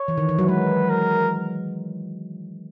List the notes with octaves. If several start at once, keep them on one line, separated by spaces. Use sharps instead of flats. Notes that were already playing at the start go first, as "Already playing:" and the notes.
Already playing: C#5
E3
D#3
E3
F#3
G#3 B4
A#4